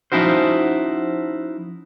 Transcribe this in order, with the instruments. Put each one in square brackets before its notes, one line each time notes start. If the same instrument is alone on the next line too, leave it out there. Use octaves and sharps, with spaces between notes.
[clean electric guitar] F3 C#4 D#4 E4 F#4 C5